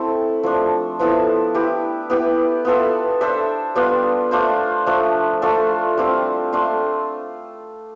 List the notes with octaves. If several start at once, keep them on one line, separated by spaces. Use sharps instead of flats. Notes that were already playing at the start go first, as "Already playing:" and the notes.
Already playing: A3 C4 E4 A4
F3 A3 D4
F3 B3 E4 A4
E4 G4 B4
B3 E4 G4 B4
B3 F4 A4 E5
D4 A4 C5 E5
G3 B3 D4 F4
A3 D4 F4 C5
F3 A3 D4
A3 D4 F4 A4
G3 C4 F4
A3 D4 F4